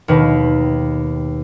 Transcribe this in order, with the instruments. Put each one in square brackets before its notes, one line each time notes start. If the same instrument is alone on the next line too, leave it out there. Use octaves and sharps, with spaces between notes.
[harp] D#2 B2 D#3 B4